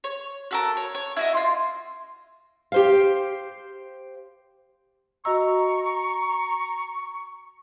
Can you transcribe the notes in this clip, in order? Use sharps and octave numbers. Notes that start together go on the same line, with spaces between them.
C#5
F#4 A4 A#4
C#5
C#5
E4 F#4 D#5
F4 C6
G4 C5 F5
F#4 D#5 A#5 C#6 E6